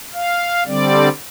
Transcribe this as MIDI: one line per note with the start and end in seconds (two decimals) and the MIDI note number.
0.14 0.63 77
0.67 1.09 50
0.67 1.09 55
0.67 1.09 60
0.67 1.09 74